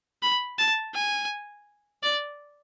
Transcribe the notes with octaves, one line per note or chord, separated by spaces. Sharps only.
B5
A5
G#5
D5